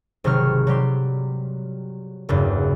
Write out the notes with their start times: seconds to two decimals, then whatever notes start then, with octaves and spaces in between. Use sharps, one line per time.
0.24 G#1 C3 F#3 C4 C#6 F6
0.67 F#3 G3 G4 C6
2.29 F#1 E2 G2